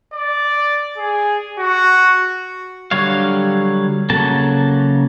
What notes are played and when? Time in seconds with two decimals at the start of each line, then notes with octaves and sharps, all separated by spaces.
0.13 D5
0.97 G#4
1.59 F#4
2.91 D3 F#3 G3 C#5 F5
4.10 C#3 F#3 A#3 A4 A5